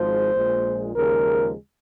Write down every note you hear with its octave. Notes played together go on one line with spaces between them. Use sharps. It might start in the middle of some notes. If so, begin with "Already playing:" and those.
Already playing: G#1 G#2 F3 G#3 C5
A#1 A#2 G#3
D#2 C#3 F3 G#3 A#4